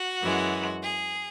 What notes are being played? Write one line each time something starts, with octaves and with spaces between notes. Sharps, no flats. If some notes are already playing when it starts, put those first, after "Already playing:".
Already playing: F#4
F#2 E3 G#3
G#4